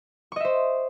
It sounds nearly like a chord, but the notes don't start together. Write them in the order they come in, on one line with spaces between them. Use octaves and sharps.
C#6 D#5 E5 C5